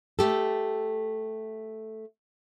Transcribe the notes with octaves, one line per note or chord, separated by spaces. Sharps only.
A3 G4 A4